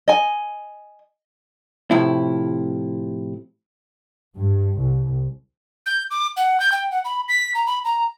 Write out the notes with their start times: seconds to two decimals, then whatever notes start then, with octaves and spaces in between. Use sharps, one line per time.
0.08 D#5 G#5
1.91 A2 C3 F3 E4
4.38 G2
4.80 C2
5.86 G6
6.11 D6
6.37 F#5
6.60 G6
6.72 G5
6.91 F#5
7.05 B5
7.29 B6
7.55 A#5
7.67 B5
7.85 A#5